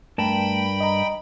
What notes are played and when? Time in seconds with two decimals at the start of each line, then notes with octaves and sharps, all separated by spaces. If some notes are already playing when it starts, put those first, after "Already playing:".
0.18 G2 A3 A#4 G5 A5 B5
0.80 D#5 A#5